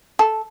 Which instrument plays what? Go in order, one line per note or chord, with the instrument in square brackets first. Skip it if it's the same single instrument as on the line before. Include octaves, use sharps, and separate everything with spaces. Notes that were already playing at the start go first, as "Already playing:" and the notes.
[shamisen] A4